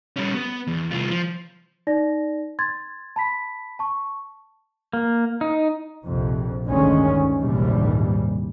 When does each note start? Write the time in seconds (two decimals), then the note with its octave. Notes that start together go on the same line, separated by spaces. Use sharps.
0.16 G3 C#4
0.34 B3
0.67 E2
0.91 C2 F4
1.10 F3
1.87 D#4 D5 A#6
2.59 C6 G#6 A6
3.16 A5 B5 B6
3.79 A5 C#6
4.93 A#3
5.41 D#4
6.04 A#1 F2 C3
6.66 A1 D2 G2 D#3 G#3 C#4
7.37 A#1 D#2 G#2 C3 E3 G3